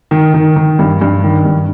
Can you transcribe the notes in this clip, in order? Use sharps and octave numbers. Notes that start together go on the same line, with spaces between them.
D#3
D#3
D#3
G2
G2
D#3
G2